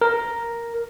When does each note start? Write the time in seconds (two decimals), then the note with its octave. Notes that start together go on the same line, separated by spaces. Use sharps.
0.02 A#4